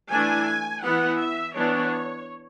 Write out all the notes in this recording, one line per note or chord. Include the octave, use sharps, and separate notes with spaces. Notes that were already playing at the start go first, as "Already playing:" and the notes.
E3 A3 D4 G#5
E3 B3 E4 F#5
E5
E3 B3 D4 C#5